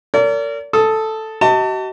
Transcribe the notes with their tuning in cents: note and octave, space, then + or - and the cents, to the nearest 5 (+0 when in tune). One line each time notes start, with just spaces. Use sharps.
A#4 -35 D5 -40
A4 +0 D#6 +20
F#4 +45 D#5 +30 A5 +30